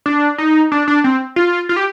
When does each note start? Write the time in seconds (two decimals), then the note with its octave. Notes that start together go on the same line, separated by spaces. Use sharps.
0.06 D4
0.38 D#4
0.72 D4
0.88 D4
1.04 C4
1.36 F4
1.69 F4
1.76 G4